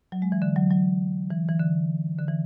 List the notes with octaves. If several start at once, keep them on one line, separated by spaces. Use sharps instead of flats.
F#3
G#3
E3
D3
F#3
F#3
E3
E3
D3
D3
E3